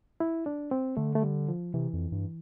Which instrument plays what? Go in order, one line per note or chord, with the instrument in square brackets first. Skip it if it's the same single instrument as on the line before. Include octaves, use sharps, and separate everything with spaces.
[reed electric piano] E4
D4
C4
[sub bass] D3 [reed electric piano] A3
[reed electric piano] A3
G3
F3
[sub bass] C3 [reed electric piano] E3
[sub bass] F2
G2